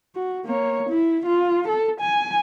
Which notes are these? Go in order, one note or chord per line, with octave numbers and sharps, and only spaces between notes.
F#4
A#3 C#5
E4
F4
A4
G#5